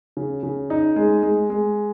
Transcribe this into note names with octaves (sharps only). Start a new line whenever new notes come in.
C#3
C#3
D#4
G#3
G#3
G#3